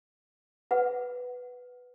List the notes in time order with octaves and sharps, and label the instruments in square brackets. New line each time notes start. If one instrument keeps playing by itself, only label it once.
[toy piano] B4 F#5